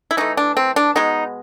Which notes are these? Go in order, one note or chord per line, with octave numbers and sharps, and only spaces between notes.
E4
E3 A3 D#4
D4
C4
D4
B2 G#3 B3 D#4